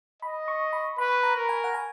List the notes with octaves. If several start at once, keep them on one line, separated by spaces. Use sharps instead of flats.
D#5 B5
C#6
B5
B4 B5
A#5
A#4
G#5
F#5
G#5